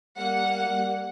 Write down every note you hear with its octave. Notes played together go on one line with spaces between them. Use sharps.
G3 A#3 F#5
G3